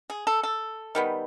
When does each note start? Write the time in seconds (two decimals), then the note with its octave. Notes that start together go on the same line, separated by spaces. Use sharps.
0.10 G#4
0.27 A4
0.43 A4
0.95 D#3 G3 B3